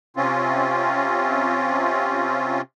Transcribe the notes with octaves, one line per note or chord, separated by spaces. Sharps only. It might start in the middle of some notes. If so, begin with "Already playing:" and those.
C3 C4 C#4 F4